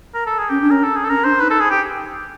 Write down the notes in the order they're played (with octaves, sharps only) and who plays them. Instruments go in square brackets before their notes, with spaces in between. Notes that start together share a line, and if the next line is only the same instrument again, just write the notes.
[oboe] A#4
A4
G#4
[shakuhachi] C#4 [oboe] G4
[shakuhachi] D4
[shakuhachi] C#4 [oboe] A#4
[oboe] A4
G#4
A4
[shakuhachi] C#4 [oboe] A#4
[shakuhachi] D4 [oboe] C5
[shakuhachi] D#4 [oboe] B4
[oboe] A4
G#4
G4